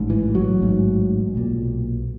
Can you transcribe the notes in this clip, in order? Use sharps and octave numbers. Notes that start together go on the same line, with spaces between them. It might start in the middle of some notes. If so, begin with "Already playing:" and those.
Already playing: A1 G#2
E3
F#3
A1 G#2
B1 A#2